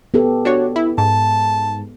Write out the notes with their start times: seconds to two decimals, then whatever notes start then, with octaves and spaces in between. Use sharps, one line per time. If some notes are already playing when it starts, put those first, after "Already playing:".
0.14 B3 G4 A4
0.45 D4 F#4 C#5
0.76 E4
0.98 G#2 A5